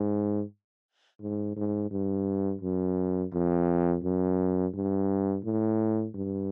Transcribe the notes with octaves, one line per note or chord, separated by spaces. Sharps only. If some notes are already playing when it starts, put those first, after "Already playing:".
Already playing: G#2
G#2
G#2
G2
F#2
F2
F#2
G2
A2
G2